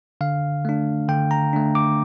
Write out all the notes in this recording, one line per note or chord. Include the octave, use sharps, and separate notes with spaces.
D3 F5
A3 D4
D3 G5
A#5
A3 D4
D6